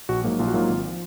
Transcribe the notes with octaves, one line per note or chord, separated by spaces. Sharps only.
A#1 F#4
G#2 F#3 A#3
A#1 F4
F#4
G#2 F#3 A#3 F4
G#1
F3